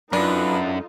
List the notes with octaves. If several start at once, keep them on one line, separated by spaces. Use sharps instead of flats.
F#2 D4 D#4 F4 A4 B4